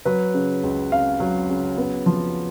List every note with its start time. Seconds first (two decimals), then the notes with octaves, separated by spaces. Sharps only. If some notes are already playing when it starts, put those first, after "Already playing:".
0.05 F#3 B4
0.34 C#3
0.63 C#2
0.91 C#4 F5
1.20 F#3
1.50 C#3
1.77 B3
2.06 F3